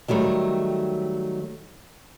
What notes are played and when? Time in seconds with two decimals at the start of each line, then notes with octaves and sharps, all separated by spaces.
0.08 D#3 F#3 G3 A3